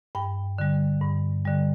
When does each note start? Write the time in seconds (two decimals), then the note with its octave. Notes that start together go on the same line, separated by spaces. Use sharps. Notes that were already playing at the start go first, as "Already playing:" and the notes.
0.15 G2 G5
0.58 D3 G3
1.02 G2
1.45 D3 G3